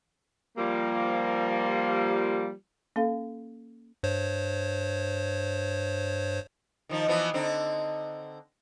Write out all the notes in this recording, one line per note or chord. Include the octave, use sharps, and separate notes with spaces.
F3 G3 A#3
A#3 C#4 A4 F5
G2 C5 C#5
D#3 F3 D#4
E3 F3 B3
D3 C4 D#4